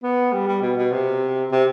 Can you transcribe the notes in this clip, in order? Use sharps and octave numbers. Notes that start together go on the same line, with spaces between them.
B3
G3
G3
B2
B2
C3
C3